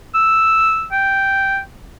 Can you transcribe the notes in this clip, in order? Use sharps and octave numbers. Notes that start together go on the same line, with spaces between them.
E6
G5